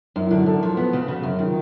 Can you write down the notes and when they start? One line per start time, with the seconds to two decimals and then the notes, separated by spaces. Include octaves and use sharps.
0.16 F#2 D#4
0.26 E4
0.31 D3
0.37 F#4
0.46 F#2 A4
0.63 F3
0.77 B3 G#4
0.93 C#3
1.08 C#3 F#4
1.23 F#2
1.39 D#3 F4